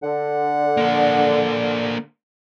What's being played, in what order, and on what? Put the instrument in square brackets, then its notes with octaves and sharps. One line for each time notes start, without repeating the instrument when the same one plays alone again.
[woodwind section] D3 [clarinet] F#5
[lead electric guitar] A#3 D4